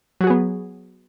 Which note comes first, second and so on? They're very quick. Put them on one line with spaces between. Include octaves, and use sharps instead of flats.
F#3 F#4 G#4 B3